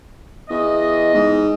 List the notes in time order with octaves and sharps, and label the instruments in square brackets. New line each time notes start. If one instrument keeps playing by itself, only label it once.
[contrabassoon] E2 [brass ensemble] D#5
[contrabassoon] G#2